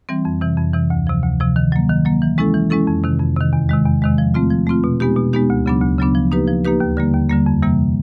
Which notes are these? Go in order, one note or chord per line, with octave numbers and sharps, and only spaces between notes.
E3 G3 C4
F2
C3 E3
F2
C3 E3
D2
C3 F3
D2
C3 F3
D#3
F#3 A#3
D#3
F#3 A#3
E3
G#3 C#4 E4 A4
E3
G#3 C#4 E4 A4
F2
C3 D#3
F2
C3 D#3
E2
C3 D#3 G#3
E2
C3 D#3 G#3
F3
A3 C4 F4
F3
A3 C4 F4
B2
G#3 B3 D#4 G4
B2
G#3 B3 D#4 G4
D2
C#3 F#3 B3 D4
D2
C#3 F#3 B3 D4
F3
A#3 D#4 G4 B4
F3
A#3 D#4 G4 B4
D#2
D3 G3 A#3
D#2
D3 G3 A#3
F2
C3 E3 G3 A#3